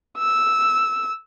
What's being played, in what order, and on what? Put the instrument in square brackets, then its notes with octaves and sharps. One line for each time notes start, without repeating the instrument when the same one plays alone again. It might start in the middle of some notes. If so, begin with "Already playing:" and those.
[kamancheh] E6